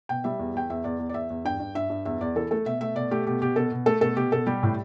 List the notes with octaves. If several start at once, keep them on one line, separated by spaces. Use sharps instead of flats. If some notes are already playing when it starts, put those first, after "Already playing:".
B2 G5
G3 E5
E2
E2 G5
E2 E5
E2 D5
E2
D5
E2 E5
E2
G2 G5
G2
G2 E5
G2
E2 E5
E2 D5
E3 A4
A3 A4
B2 E5
A3 E5
B2 D5
A3 G4
B2 G4
B2 G4
B2 A4
B2
A3 A4
B2 A4
B2 G4
B2 A4
G3 G4
A2